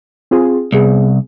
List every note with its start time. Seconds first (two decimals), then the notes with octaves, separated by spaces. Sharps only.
0.31 C4 F4 G#4
0.72 C2 B3 G#4